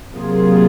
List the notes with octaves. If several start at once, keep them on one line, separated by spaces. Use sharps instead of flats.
C3 F#3 A#3 F4 G#4